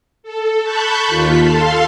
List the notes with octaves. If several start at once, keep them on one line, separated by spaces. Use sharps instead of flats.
A4
A5 B5 C#6 F#6 G6
D#2 F4 B6
A4 F5 A5 C6